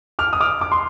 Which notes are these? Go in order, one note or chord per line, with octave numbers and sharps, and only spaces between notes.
D6 F6
D#6
D6 F6
D6
C6